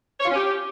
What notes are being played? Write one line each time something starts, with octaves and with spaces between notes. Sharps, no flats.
C#5
F4
C#4
G4